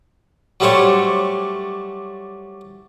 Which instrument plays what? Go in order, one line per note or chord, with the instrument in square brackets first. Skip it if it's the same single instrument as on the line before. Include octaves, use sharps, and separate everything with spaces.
[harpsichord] F#3 G3 A3 D4 C5 C#5